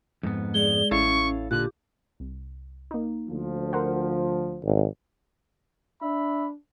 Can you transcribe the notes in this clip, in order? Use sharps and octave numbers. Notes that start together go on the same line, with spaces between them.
F2 G#2 B3
G#3 G#4 D5 G7
A1 C#4 E4 A4 C#5 F5 C#6
A#2 D3 F4 G4 D6 F#6
C2
A#3 D#4
D2 F3
A#4 C5 F#5
G#1
D4 E5 B5